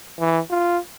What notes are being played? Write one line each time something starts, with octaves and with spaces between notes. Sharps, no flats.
E3
F4